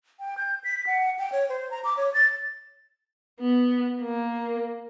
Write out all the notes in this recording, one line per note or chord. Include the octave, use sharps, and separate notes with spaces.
G5
G6
B6
F#5
G5
C#5
C5
A#5
D6
C#5
A6
B3
A#3